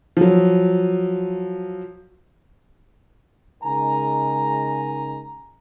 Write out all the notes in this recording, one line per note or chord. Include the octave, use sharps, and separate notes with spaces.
F3 F#3
C#3 G#3 D#4 A#4 G#5 A#5